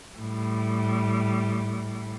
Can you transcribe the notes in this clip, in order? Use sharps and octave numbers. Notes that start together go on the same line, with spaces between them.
A2 G3